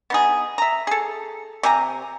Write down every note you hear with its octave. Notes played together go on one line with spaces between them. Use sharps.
B3 D#4 G#4
E5 A#5
G#4 A4
C3 G4 G#5 A#5